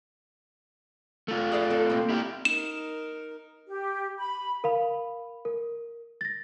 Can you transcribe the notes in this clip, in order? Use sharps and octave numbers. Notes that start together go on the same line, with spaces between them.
A3 F4
G#4 D5 F5
C4 A4
A#3 C4
E4 G4
D#4 A#4 E7
G4
B5
A#4 F5 B5
A#4
A6 A#6